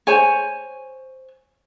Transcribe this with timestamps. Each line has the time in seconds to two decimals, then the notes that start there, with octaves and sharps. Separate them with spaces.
0.07 C5 C#5 G#5